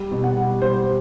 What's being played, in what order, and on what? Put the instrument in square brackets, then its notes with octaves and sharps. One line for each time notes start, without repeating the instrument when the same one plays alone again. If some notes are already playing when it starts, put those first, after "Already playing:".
Already playing: [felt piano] G3
B2
[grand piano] F#5
[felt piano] G3
[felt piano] G3 [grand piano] C5